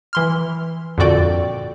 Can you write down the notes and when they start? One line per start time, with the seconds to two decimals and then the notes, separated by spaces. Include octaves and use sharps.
0.13 E3 C6 F6
0.98 F2 A#2 D3 F#4 D5 G5